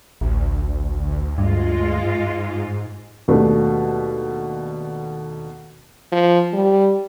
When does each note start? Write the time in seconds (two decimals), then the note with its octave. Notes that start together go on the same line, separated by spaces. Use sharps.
0.21 A1 D2
1.38 G2 G#3 F4
2.04 G#2
3.28 D#2 B2 A3 D4
6.12 F3
6.53 G3